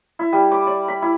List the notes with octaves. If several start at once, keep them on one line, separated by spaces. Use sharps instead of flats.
E4
G3
D6
D5
B5
E4